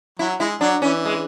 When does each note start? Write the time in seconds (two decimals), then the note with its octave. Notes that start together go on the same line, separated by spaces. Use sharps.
0.19 F#3 E4
0.40 G#3 E4
0.61 F#3 D4
0.82 E3 C#4
1.05 G#3